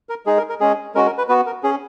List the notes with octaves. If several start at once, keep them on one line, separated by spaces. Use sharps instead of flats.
A#4
G#3 D#4 G#4
A#4
A#4
G#3 C#4 G#4
G#3 C#4 F#4 A#4
A#4
B4
B3 F#4 B4
A#4
C#4 G#4